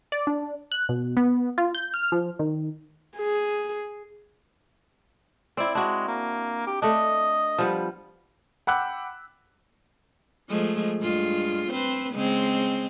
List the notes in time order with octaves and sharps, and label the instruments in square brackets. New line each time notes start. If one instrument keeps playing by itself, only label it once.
[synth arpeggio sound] D5
D4
F#6
B2
B3
F4
G6
F6
F3
D#3
[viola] G#4
[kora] C4 E4 [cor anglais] D5
[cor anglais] G#3 [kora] D4 F#4
[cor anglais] A#3
G4
[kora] A3 D4 [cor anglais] D#5
[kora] F3 G3 B3
[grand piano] F#5 G5 B5 D6 E6 F#6
[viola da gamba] F3 G#3 A3
G2 G#3 F4
C4 B4 C5
C#3 G#3 C4